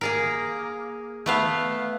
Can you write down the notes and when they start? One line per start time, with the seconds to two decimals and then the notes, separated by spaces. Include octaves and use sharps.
0.01 A#3 G#4 A#4
1.26 A3 B3 F5